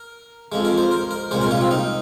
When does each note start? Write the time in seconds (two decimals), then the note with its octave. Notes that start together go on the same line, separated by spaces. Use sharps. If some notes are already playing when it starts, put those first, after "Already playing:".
Already playing: A#4
0.52 F2 F3 G#3
0.65 A#4
0.78 C5
0.91 A#4
1.11 A#4
1.31 C2 A#2 G#3 C5
1.41 A#4
1.51 F4
1.61 C4
1.71 D#4